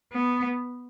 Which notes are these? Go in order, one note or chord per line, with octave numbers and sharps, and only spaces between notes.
B3